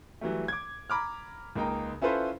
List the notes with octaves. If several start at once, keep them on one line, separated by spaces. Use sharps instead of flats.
E3 F#3 G3 A3
D6 G#6
A#5 B5 D6 F6
C#2 A#3 D#4 G5 A#5
C#4 E4 F4 A4 B4 C5